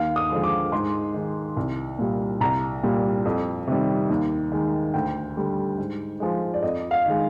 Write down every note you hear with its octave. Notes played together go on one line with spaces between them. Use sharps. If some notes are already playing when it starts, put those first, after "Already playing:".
Already playing: D#2 F5
D#6
D3 F3 G#3
D6
G#2 C6
D#3 G#3
C2
A#2 G3
C2 A#5
A#2 G3
F2
C3 D#3 G3
D#2
D#3 G#3
D2 G5
D3 G3
G#2
F3 G#3
D5
F2 D#5
F5
D#3 G#3